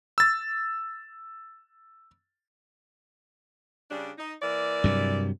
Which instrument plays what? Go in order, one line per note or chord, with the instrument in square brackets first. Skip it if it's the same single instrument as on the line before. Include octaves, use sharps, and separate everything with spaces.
[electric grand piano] E6 A6
[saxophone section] C#3 G3 D4
D#4
E3 A#3 D5
[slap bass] G2 C3 F#3